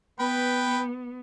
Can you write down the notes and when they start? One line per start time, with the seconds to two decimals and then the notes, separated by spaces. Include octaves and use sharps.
0.19 B3 B4 G5 B5